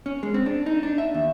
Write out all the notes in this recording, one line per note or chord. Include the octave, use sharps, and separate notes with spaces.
C#4
G#3
C4
D4
D#4
D4
E5
D#2